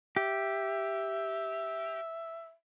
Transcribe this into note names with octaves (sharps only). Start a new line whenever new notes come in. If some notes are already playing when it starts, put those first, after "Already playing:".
G4 E5